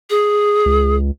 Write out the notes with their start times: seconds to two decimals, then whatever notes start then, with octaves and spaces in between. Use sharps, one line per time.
0.10 G#4
0.66 C#2